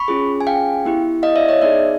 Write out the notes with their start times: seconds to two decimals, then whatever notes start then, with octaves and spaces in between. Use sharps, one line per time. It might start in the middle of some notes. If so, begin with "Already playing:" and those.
Already playing: B5 C#6
0.08 C#4 F4 G#4
0.41 G#5
0.47 F5 G5
0.85 B3 E4 G4
1.23 D#5 F5
1.36 D5 E5
1.49 C#5 D#5
1.61 B3 D#4 G#4 D5 E5